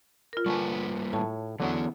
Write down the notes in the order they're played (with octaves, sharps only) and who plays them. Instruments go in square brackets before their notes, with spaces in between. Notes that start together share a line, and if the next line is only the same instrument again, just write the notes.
[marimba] F4 A#4
[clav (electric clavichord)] D3 [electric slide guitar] G3 A#3 B4 [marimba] G#5 A5 C#6
[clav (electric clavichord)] A2 C#5 [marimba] A5
[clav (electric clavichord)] D3 F#3 C#4 [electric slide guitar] E3 B3 E4